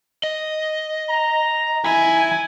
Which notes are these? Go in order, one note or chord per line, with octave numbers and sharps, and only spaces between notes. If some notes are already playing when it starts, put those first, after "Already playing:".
D#5
A#5
E4 G#5